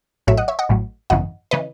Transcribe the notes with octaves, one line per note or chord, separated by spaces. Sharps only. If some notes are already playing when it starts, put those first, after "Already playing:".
A1 A2 F#3 C#5 E5
D#5 F#5
C#5 E5
D#5 F#5
A1 A2 F#3
G#1 F#2 C#3 E3 D#5 F#5
C#3 E3 B4 D#5